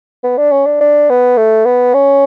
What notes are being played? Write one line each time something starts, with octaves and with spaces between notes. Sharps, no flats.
B3
D4
C#4
D4
D4
B3
A3
B3
C#4